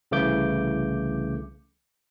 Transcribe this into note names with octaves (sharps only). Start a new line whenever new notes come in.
C2 C#3 E3 A3 D6 G6